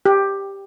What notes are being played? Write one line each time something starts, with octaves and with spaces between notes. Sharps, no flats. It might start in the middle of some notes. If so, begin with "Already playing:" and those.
G4